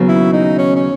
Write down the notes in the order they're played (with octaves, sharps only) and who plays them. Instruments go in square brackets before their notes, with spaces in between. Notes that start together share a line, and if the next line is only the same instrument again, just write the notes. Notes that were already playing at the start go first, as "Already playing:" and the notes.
Already playing: [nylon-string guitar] D#2 C#3 F#3 B3
[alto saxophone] E4
D#4
C#4
C#4